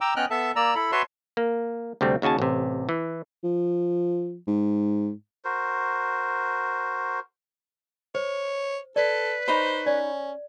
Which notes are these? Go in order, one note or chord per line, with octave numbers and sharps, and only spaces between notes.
G5 A#5 D6 E6
B3 C#4 D#5 G5 F6 F#6
B3 A4 E5 A5
A#3 D5 A#5 E6
E4 A4 B5
F#4 B4 C#5 E5 A5 C6
A#3
D2 C3 G3 A3 C4
D#2 C#3 F#4 G#5 A5
A1 C3
E3
F3
G#2
F#4 A#4 C5
C5 C#5
A4 B4 D5
D#4 C5 C#5 B5
C#4 D5